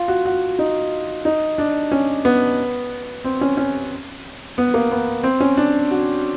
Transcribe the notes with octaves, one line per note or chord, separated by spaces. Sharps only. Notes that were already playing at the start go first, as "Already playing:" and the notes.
Already playing: F4
F#4
F#4
D#4
D#4
D4
C#4
B3
C4
C#4
C#4
B3
A#3
B3
C4
C#4
D4
F#4